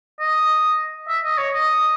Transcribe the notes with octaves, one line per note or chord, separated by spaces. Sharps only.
D#5
E5
D#5
C#5
D#5